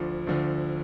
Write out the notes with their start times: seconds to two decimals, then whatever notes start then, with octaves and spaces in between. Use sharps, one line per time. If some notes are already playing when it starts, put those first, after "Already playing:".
Already playing: D2 D3 F3
0.27 D2 D3 F3